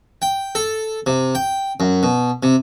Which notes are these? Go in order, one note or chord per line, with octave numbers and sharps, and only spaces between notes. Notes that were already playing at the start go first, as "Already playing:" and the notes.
G5
A4
C3
G5
F#2
B2
C3